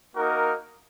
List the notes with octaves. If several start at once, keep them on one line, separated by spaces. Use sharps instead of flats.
A#3 D#4 F#4 A#4